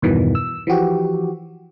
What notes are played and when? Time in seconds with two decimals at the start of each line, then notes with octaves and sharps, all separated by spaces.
0.02 E2 G2 B2 D#3 E3
0.35 E6
0.67 E3 F3 F#4 G4